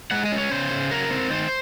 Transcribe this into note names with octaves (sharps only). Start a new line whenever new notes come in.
G#3 F#5
D#5
C#4
C#5
C#3 C5
C#3
F#3 A#4
C4
D#3 C5